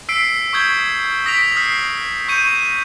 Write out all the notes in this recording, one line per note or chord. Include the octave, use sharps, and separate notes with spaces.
E6 B6 C7 D7
C#6 D#6 G6 G#6 G7
D#6 A#6 B6 D7 F7
D#6 F6 B6 C7
C#6 G6 C#7 D#7